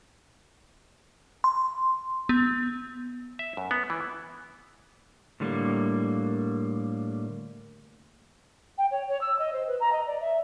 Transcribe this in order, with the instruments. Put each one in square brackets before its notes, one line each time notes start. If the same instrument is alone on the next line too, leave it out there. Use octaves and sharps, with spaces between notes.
[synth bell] C6
B3
[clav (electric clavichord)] E5
F#2
B3
E3
[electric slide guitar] A2 D3 G3 A3 A#3
[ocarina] G5
C#5
C#5
E6
D#5
C5
B4
A#5
D#5
D5
E5